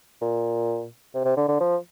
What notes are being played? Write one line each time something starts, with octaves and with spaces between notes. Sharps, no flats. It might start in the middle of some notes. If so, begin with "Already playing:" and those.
A#2
C3
C3
D3
D3
F3